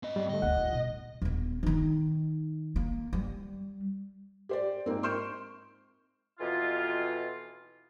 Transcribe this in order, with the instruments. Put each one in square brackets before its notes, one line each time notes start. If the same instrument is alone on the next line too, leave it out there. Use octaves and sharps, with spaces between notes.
[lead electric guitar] C4 D#5
[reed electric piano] G#2 G3
[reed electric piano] D3 A3 [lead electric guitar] D#5
[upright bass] D2 A3 [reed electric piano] F#5
[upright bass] F4
B2
D#1 B3
D#3 D#4
A#3
G3
[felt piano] G4 C5 D5
G#2 A#3 C4
C6 C#6 F6 G6 D7 E7
[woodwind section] F2 B2 E3 F4